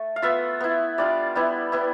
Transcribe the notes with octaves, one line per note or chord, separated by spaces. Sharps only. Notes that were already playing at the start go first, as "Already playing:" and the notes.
Already playing: A3
F5
B3 F4 E5
B3 E4
G3 D4 F4 D5
G3 B3 E4
B3 E4